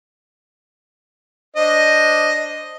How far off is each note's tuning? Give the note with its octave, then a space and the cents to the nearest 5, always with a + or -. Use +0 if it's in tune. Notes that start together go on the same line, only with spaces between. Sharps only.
D4 +0 C5 +0 D#5 +0